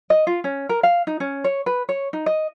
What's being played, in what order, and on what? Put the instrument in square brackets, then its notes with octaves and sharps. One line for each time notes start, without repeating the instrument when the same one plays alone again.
[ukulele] D#5
F4
C#4
A#4
F5
D#4
C#4
C#5
B4
C#5
D#4
D#5